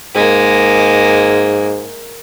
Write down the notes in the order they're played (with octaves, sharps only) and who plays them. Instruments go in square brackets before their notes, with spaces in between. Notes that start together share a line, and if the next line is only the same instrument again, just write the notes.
[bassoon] G#2 [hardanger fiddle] G#3 A#3